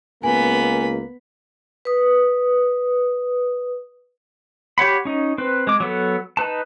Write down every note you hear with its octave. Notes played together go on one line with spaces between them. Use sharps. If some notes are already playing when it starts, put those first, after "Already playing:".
C#2 A#3 B3 G#5 B5
B4 D#6
G4 C#5 F#5 B5
C#4 D#4
C4 B4
G#3 D6
F#3 B3 A4
D#4 B4 A5